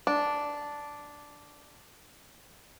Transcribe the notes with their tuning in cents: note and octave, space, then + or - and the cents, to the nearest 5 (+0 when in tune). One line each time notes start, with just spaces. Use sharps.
D4 -5